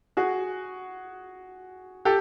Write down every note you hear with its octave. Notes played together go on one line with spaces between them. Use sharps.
F#4 G#4
G4 A4